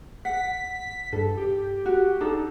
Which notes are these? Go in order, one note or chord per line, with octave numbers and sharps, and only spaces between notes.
F#5 B6
G2 A4
G4
F#4
D4 D#4 A4